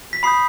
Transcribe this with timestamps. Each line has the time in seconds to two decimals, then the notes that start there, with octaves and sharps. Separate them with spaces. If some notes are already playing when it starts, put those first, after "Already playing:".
0.13 B6
0.23 B5 D#6 G6 C7